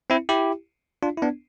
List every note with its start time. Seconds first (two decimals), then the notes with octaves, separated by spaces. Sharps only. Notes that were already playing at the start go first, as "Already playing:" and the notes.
0.10 C4 E4
0.29 E4 G4
1.03 D4 F4
1.17 E4
1.22 B3 D4